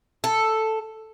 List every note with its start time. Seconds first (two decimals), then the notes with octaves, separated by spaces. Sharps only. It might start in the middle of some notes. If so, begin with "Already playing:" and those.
0.24 A4